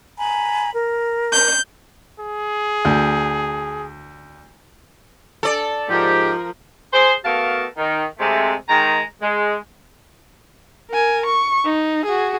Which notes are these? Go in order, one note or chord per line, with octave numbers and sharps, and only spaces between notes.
G#5 A#5 B5
A#4
G6
G#4
D2
A4 D5
G#2 F3 G4 A#4
G#4 C5
A3 B3 F#4 A#4 F5 A5
D#3
C3 G#3 A3
D#3 G#3 A#5
G#3
A#4 G#5
C#6
D#4
F#4 G#4